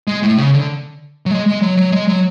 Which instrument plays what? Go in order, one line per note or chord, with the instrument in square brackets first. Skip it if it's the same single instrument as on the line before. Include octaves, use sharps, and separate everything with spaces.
[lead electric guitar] G#3
A2
C#3
D3
F#3
G#3
G#3
F#3
F#3
G#3
F#3